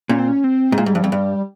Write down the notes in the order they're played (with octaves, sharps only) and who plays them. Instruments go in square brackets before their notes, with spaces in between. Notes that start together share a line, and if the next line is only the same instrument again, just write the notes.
[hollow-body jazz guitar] A#2 [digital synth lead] C#4
[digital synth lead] C4
C#4
C4
[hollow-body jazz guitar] G#2
[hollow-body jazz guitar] A#2 [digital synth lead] G#3
[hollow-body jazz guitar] G#2 [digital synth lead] G3
[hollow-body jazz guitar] G2 [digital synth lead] F3
[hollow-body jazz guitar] F2 [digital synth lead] G3
[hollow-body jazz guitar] G2